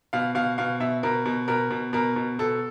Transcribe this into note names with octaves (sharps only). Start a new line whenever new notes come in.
B2 F5
B2 F5
B2 F5
B2 E5
B2 A#4
B2
B2 A#4
B2
B2 A#4
B2
B2 A4